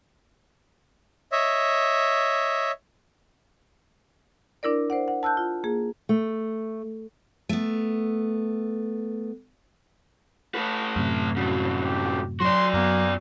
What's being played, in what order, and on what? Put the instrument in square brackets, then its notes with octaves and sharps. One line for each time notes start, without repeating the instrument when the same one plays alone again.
[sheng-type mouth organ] C#5 D#5 E5
[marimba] D4 E4 A#4 D5
C5 D5 F#5
F#5
A5 E6 F#6 G6
F4
A#3 G#4
[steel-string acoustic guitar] A3
A3 B3
[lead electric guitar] A3 B4
[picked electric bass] F#2 A2 C3 [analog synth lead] F6
[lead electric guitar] G2 C#3 [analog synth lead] F#4
[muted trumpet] G4
[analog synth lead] F#3 [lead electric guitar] F#4 D5 [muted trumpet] C6
[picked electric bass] F#2 B3 [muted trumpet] A#3